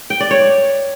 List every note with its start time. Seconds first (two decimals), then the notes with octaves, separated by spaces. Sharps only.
0.10 G5
0.20 D5
0.31 C#5